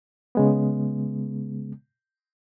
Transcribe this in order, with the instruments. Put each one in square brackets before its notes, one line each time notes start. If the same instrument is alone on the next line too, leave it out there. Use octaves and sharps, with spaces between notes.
[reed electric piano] C#3 G#3 B3